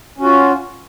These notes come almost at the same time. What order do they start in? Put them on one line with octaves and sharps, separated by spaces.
C#4 F#4 F4